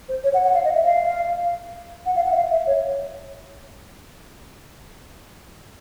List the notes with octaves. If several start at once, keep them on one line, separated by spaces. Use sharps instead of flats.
C5
C#5
F#5
F#5
F5
D#5
E5
F5
F#5
F5
F#5
E5
F5
E5
C#5